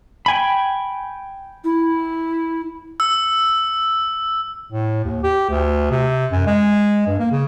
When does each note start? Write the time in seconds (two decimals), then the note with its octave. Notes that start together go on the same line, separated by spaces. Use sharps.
0.26 G5 G#5 B5
1.64 E4
3.00 E6
4.71 A2
5.05 D#2
5.23 G4
5.49 D2
5.91 C3
6.32 F#2
6.46 G#3
7.07 G2
7.19 A#3
7.31 C#3